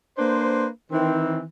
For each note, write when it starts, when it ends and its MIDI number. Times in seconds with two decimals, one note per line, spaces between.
0.18 0.67 58
0.18 0.67 62
0.18 0.67 71
0.18 0.67 72
0.92 1.42 51
0.92 1.42 52
0.92 1.42 60